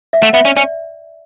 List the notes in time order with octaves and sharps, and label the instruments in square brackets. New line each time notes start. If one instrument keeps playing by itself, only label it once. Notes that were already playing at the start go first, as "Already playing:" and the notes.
[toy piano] E5
[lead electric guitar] A3 [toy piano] F#5
[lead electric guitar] B3 [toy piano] E5
[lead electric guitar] C#4 [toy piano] D5
[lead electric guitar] C#4 [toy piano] D5